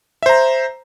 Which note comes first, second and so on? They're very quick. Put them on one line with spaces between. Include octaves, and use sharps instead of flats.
E5 C5 A#5